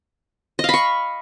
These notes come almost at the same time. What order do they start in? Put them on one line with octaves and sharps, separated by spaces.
D#5 F5 B5 C#6